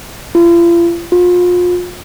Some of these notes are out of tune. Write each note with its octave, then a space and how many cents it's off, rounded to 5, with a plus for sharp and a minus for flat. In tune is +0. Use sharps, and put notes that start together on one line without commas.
F4 -40
F4 +35